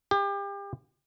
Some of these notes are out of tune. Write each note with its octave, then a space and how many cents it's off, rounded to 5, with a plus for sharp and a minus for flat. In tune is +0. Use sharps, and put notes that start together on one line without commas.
G4 +30